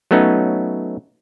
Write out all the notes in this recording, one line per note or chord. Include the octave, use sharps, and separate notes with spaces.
F#3 A3 B3 C#4 D#4